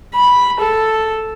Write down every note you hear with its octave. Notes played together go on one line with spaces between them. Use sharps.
B5
A4